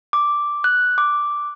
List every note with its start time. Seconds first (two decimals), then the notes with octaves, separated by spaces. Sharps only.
0.13 D6
0.64 F#6
0.98 D6